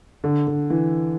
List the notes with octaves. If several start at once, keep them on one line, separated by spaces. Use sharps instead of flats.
D3
D3
E3